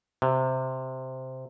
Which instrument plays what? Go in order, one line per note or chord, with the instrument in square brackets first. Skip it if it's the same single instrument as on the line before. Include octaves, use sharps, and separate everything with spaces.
[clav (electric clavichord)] C3